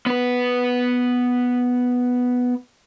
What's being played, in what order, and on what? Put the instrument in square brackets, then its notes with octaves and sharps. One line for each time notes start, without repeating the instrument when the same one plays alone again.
[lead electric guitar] B3 B4